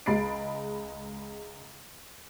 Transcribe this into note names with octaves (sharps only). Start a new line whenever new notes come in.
C#2 G#3 B5 A6 C7 D7